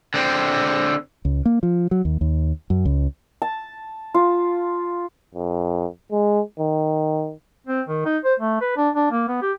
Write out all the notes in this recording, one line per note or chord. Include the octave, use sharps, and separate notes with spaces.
D3 C4
C#2
A#3
F3
F#3
D#2
D#2
F#2
C#2
A5
F4
F2
G#3
D#3
C4
D#3
D#4
C5
A3
B4
D4
D4
A#3
B3
G4